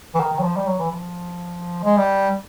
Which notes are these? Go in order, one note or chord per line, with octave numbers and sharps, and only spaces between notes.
E3
D#3
D#3
F#3
F3
G3
F#3
E3
F3
G#3
G3